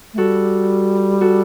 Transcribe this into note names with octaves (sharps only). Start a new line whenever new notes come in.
A3
G3 F#4 A4
F#4 A4